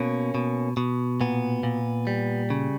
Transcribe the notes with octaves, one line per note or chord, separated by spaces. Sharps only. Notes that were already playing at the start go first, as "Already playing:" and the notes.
Already playing: B2 A#3 C#4
B2
B2
A#2 B3
A#2
G3
C#3